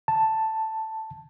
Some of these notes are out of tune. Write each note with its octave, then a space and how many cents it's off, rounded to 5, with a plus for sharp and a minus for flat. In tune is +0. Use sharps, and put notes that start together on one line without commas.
A5 +5